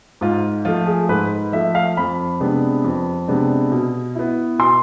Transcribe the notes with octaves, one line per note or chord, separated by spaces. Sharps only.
G#2 F4
F3 A3 F4
G#4
G#2 B4
F3 A3 E5
F5
F2 B5
C3 G#3 B3 D4
F2
C3 G#3 B3 D4
B2
B3 E4
B2 C6